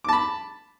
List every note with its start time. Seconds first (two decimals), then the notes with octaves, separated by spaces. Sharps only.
0.04 D6
0.09 A5
0.13 B5